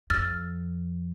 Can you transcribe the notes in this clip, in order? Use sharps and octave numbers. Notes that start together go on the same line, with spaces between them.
F2 E6 F6 A6